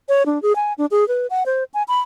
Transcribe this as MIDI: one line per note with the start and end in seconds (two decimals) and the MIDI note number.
0.09 0.26 73
0.26 0.41 62
0.42 0.55 68
0.56 0.73 80
0.78 0.86 62
0.91 1.07 68
1.08 1.27 71
1.30 1.44 78
1.46 1.64 72
1.74 1.83 80
1.88 2.00 83